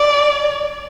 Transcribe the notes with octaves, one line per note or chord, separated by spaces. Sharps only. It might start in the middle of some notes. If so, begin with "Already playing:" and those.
Already playing: D5